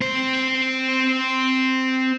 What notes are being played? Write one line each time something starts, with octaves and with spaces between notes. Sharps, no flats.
C4 C5